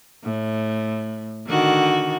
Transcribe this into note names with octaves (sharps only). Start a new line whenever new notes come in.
A2
D3 D#3 F#4